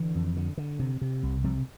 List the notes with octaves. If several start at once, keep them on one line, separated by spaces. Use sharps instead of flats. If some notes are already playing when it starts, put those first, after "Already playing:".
Already playing: D3 E3
F2
D3
D3
C3
C3
C2
C3 F3 G3